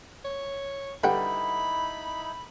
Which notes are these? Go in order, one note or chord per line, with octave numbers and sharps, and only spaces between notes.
C#5
D3 G3 D#4 E4 B4 F#5 G5 B5